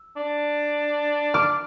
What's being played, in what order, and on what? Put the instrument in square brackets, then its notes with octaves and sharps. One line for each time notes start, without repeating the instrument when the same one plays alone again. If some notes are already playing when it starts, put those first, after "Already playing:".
Already playing: [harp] E6
[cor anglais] D4
[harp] D6 F6